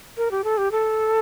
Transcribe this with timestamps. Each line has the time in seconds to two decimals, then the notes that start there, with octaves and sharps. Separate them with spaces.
0.17 A#4
0.31 G4
0.44 A4
0.58 G4
0.72 A4